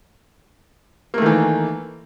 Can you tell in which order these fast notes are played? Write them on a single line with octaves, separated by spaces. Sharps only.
A#3 A3 D#3 E3